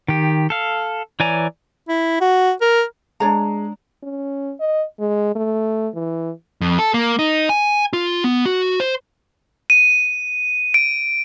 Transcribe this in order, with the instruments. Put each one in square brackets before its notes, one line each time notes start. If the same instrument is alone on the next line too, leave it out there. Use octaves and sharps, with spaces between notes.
[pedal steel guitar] D#3 G4
A4 F5
E3 C#5 D5 G#5 A#5
[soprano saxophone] E4
F#4
A#4
[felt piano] G#3 [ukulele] D4 C#5 A#5
[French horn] C#4
D#5
G#3
A3
E3
[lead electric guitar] F2
A4
A#3
D#4
G#5
F4
B3
F#4
C5
[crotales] D#7
D7